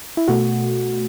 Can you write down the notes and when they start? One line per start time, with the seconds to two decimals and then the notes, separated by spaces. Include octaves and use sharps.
0.17 E4
0.28 B2 A3 F#4